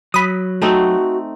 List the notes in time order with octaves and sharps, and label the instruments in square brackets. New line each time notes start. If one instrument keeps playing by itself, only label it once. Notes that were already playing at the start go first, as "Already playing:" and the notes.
[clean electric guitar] F#3 [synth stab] B5 D#6
[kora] A3 C4 D#4 [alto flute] F#4